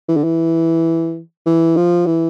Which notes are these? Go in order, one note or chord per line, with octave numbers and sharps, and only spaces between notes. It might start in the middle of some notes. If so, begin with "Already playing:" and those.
E3
D3
E3
E3
F3
E3